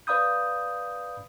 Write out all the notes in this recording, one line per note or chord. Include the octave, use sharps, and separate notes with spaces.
B4 D5 F5 B5 D#6 G6